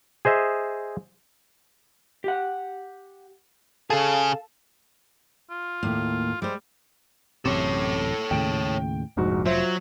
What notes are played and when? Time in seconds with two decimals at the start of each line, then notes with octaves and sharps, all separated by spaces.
0.25 G#4 C5 D#5 E5
2.24 G4 F#5
3.90 C#3 G#4 A4 F5 A5
5.50 F4
5.83 D#2 A2 A#3
6.42 G3 G#3 C5
7.46 A1 F#2 C3 A4 C#5 D6
8.31 D#2 A2 C#3 G5 D7
9.17 F1 A#1 G#2 F#4
9.46 F#3 F4 C5 E5